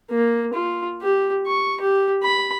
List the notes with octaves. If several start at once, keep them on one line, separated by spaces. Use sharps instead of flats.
A#3
F4
G4
C#6
G4
B5